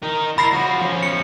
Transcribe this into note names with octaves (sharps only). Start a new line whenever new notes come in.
D#4 A#4
E4 A#4 B5 A#6 C7
F3 F#4
F3 C#4
C#7